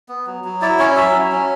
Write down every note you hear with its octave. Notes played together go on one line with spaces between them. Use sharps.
B3
F#3
F#3
E4 D5
C#4 C#5
F#3 E5
F#3
C#4